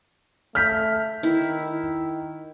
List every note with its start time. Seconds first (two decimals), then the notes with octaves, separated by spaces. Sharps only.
0.55 A3 F6 G6 B6
1.23 D#3 E4